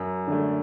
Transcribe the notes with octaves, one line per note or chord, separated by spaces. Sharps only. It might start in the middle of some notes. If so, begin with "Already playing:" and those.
Already playing: F#2
D3 A3